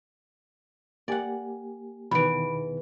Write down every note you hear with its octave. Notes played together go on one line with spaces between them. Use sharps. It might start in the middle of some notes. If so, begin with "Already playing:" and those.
A#3 G4 D5 F#5 G#5
E2 B2 D#3 E3 B5 D7